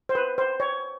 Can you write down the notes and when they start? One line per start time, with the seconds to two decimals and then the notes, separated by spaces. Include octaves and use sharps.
0.09 C5
0.15 B4
0.38 C5
0.60 C#5